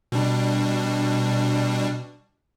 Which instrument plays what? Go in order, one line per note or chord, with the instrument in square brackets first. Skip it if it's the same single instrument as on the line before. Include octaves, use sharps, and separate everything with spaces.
[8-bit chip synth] B2 G3 D4